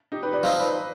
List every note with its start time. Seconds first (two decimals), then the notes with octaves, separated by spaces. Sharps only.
0.12 D#4 G4
0.23 G4 B4
0.33 B4 D5
0.43 F3 C4 D#4 C5 D#5
0.59 B4 D5